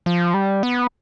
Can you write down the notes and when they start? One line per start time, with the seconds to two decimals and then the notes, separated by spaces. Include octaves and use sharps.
0.06 F3
0.34 G3
0.63 B3